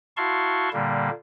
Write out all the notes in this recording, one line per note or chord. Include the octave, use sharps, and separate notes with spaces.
E4 F#4 F5 A5 C6 C#6
A#2 D3 G3 A#3